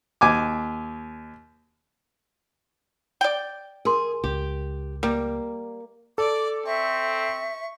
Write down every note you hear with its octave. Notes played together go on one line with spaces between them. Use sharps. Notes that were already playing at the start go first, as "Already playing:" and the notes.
D#2 G#5 D6
D5 G5
G#4 A#4 C6
C#2 G4
G3 A#3
A4 D5 D6
C4 E5 C#6